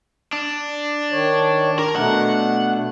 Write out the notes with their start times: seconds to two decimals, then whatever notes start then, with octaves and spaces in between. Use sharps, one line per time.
0.33 D4
1.12 D#3 C#5
1.79 A#4
1.95 B2 A3 D4 F#5